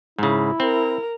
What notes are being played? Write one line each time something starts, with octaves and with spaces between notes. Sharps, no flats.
G#2 C#3 E4
C4 A#4